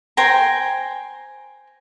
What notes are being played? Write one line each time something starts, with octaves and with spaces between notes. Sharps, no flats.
C5 G5 G#5 A#5